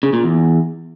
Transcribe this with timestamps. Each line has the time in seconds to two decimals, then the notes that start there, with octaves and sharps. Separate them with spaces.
0.03 C#3
0.13 A#2
0.23 E2